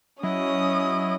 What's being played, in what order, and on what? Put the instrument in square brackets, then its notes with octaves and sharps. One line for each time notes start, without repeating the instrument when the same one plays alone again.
[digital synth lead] F#3 [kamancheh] C#4 D#6 [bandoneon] E4 D#5